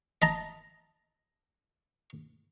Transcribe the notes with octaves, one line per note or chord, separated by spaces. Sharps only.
D#5 A5 A#5